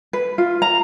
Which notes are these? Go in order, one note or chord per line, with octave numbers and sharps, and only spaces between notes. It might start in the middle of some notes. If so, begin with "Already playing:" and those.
B4
F4
A#5